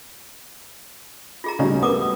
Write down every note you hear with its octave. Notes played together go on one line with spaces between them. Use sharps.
F4 G#4 A#5
D2 C#3 G3 C#4 D#4
B3 A#4 D6 D#6